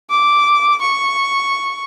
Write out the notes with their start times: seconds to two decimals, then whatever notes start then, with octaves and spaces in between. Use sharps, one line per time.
0.11 D6
0.82 C#6